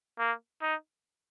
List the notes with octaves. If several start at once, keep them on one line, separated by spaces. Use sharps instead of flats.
A#3
D#4